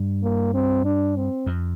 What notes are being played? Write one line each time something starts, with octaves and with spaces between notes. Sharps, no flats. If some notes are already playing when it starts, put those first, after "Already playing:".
Already playing: G2
A#3
C4
D4
C4
F2